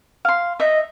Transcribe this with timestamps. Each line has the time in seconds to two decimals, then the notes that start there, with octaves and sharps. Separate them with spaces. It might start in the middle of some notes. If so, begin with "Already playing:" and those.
0.25 F5 C6
0.60 D#5 E5